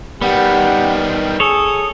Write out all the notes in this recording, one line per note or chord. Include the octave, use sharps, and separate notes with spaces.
D#3 G3 B3 G4 F#5
G#4 A4 C#5 D#6